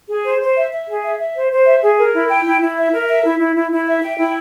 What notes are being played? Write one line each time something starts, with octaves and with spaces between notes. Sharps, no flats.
G#4
C5
C5
E5
E5
G#4
E5
E5
C5
C5
E5
G#4
A#4
E4
G5
E4
E4
E5
A#4
E5
E4
E4
E4
E4
E5
G5
E4